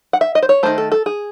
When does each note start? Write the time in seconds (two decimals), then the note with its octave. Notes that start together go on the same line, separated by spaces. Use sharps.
0.13 F#5
0.21 E5
0.35 D#5
0.42 C5
0.49 C#5
0.63 D#3 F#3 A3 C5
0.78 A4
0.92 A4
1.06 G#4